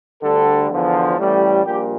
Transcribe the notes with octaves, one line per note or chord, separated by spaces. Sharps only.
D2 D3 G3 A4
E2 D3 F3
A1 A2 G3
A#1 A#2 G3 G4